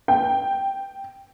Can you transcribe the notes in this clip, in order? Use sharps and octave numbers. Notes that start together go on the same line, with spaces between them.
G5